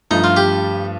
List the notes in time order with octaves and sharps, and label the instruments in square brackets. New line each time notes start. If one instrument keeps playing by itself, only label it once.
[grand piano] G2 F3 A3 [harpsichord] D#4
[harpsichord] F4
G4